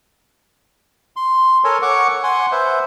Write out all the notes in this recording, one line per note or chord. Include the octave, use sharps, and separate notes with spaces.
C6
A4 A#4 C#5 G#5
C#5 F#5 C#6 D6
F#5 G#5 C6
B4 C5 E5